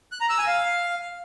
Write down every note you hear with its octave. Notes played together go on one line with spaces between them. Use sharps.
F#6
A#5
E6
G#5
F5